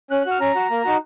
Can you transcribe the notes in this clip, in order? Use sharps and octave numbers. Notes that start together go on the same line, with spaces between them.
C#4 F#6
F#6
F#4 F6
C#4 A#5
F#4
A#3
D#4 F#4